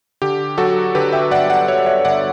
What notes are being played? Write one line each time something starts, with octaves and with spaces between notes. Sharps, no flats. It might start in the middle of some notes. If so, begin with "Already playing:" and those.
D3 G4
F#3 F#4 A4
D3 G4 B4
E5 G5
G1 D5 F#5
D5 F#5
F#3 C#5 E5
C#5 E5
G1 D5 F#5